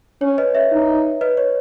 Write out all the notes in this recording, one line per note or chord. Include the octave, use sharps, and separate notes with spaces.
C#4 C#5
B4 D#5
C#5 E5
D#4
B4 D#5
C#5